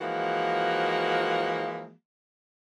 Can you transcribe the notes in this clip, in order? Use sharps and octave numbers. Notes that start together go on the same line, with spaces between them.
E3 F3 G#3 A#3 F#4